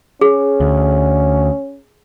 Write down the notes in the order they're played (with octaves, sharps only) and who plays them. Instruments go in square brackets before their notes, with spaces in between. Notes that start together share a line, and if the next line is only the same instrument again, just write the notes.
[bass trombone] C#4 [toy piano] G#4
[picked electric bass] D2